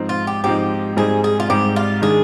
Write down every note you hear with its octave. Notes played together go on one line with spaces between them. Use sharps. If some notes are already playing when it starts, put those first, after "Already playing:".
Already playing: G#2 F3 C4 D#4
F4
G4
G#2 F3 C4 D#4 G4
G#2 G3 C4 D#4 G#4
G#4
F4
G#2 G3 C4 D#4 G4
F4
D#3 G#3 D4 G#4